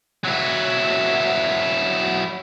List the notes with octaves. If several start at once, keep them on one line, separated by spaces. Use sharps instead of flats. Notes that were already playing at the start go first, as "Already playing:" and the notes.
F#3 E4